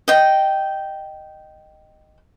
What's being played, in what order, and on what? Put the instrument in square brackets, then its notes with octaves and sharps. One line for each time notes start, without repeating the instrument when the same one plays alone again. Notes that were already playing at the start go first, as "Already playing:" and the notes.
[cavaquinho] D#5 G5